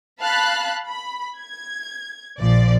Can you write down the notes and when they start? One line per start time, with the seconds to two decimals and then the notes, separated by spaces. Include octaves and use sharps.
0.20 F5 A5 B5 F#6
0.88 B5
1.38 G#6
2.40 A#1 F3 D5